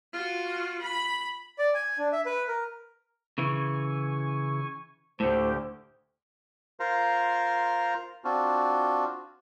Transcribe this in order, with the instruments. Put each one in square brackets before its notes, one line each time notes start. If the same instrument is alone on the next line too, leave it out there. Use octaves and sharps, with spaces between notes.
[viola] F4 F#4
B5
[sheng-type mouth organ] D5
G#5
D4
E5
B4
A#4
[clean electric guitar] C#3 E3 [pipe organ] G#5 C#6
[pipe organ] D2 G4 [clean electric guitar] A2 D3 [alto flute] C5
[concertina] F4 A#4 C5 F5 A#5
C4 D4 F4 F#4